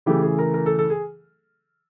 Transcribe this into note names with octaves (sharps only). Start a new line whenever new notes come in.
C#3 E3 A3 G4
G#4
A#4
A#4
A4
A4
G#4